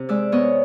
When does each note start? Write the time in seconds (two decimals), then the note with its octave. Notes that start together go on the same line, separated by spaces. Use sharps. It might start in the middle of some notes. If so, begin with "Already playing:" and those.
Already playing: C3
0.09 G#3 D5 E5
0.32 B3 C#5 D#5